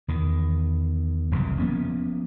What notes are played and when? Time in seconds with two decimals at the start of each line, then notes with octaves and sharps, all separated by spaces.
0.08 E2 D#3
1.31 F#1 C2 F2 E3
1.59 F3 A#3 B3 C#4